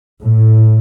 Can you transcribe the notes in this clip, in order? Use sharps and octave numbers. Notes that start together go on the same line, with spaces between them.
A2